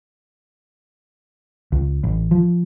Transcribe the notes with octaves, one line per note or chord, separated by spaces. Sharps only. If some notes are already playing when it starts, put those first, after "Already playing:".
C#2
A1
F3